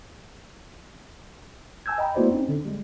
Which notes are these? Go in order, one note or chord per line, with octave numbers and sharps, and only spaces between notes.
G#5 A5 E6 G6 G#6
D#5 G5 A#5 B5
A3 B3 E4 F#4 C5 D5
C4 C#4 D#4
D3
G3 G#3